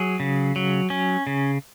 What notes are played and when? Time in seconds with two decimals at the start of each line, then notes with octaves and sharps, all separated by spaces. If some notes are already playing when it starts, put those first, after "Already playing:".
Already playing: F#3 G#4
0.20 C#3
0.56 F#3
0.90 C#4
1.27 C#3